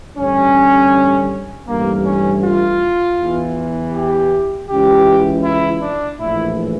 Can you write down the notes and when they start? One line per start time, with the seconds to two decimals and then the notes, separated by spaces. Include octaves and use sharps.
0.17 A1 G2 D3 C#4
1.68 A1 G2 E3 A#3
2.06 C#4
2.44 F4
3.19 E2 E3
3.94 G4
4.68 C#2 C#3 E3 G4
5.44 E4
5.82 D4
6.19 A#1 A2 E3 E4